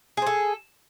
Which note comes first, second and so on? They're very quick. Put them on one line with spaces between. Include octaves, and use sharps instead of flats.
G#4 C5 A4